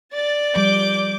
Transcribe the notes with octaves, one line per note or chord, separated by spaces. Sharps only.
D5 A6
F3 G3 D6 G6